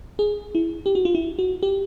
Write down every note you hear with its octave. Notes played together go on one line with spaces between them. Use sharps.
G#4
E4
G4
F#4
F4
E4
F#4
G4